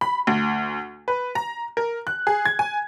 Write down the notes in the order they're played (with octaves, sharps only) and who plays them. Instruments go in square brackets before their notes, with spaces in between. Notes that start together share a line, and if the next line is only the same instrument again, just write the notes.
[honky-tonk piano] B5
D2
B4
A#5
A#4
F#6
G#4
G#6
G#5